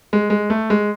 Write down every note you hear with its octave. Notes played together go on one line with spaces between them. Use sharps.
G#3
G#3
A3
G#3